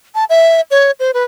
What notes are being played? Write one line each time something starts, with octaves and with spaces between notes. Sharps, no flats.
A5
E5
C#5
C5
B4